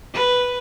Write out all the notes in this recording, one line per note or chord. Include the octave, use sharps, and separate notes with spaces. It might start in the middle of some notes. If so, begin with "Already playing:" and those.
B4